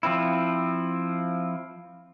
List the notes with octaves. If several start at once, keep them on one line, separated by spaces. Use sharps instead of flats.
F3 C4 E4